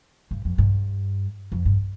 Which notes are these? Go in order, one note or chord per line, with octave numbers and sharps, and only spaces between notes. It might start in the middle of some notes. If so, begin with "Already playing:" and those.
G2
F2
G2
F2
G2